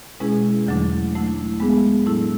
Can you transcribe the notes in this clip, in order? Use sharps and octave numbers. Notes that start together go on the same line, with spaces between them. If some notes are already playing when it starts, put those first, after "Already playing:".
B2 G#3 C#4 E4 G#4
E2 D3 F#3 A3 D4
F#3 A3 E4
G#3 B3 D4 G#4
A2 F#3 A3 E4 A4